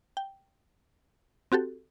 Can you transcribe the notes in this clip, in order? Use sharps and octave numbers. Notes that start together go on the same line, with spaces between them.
G5
C4 F#4 G4 A4